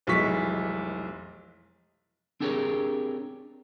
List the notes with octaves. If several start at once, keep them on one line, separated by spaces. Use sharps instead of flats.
F1 B1 E3 G#3 C#6 B6
C4 D4 G4 G#4 A#4 C#5